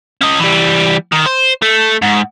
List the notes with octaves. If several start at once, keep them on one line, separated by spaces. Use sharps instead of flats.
C#4 D#5
E3 G3
D#3
C5
A3
G#2